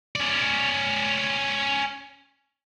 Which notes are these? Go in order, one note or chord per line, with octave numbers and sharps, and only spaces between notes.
C#4 D5